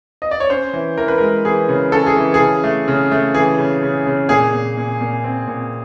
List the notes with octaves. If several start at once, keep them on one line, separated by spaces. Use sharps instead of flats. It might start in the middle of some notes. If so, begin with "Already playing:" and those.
D#5
D5
C#5
C#4 C5
E3
E3 A#4
B4
G#3 A#4
E3 G#4
C#3
C#4 A4
G#4
E3
G#4
C#3
A3
C#3
A3
E3 G#4
C#3
C#3
C#3
A#2 G#4
A#2
A#2
A#2
C4
A#2